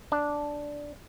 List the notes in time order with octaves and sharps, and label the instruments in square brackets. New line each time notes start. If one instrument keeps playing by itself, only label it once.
[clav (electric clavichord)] D4